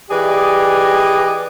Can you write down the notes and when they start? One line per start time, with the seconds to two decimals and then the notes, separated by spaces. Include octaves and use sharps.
0.11 E3 G4 G#4 D5 D#5